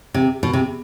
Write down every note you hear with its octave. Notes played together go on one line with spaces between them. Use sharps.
C3
B2
C3